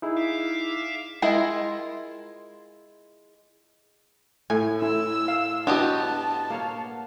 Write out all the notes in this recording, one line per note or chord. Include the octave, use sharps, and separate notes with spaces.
D#4 E4 G#4
E5 F5 D6
G#3 E4 F4 G#4 A#4
A2 G#5
E4 E6
F5
B3 D4 F#4 G4 D#5 A5
A#3 C#5 F5